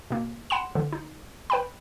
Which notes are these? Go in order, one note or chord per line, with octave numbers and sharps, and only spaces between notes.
B2 A#3
F#5 B5 C6 E7
D3 E3
D#4
B4 G5 B5